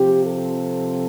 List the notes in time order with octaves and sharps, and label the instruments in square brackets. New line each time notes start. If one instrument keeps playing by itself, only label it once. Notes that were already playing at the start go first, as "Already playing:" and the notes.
Already playing: [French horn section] C3 F3 C4 G4
A4